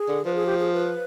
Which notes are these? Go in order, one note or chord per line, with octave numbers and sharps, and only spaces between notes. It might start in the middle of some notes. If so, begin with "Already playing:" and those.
Already playing: G#4
D3
F3 B4
G#4
G4
G#4
B4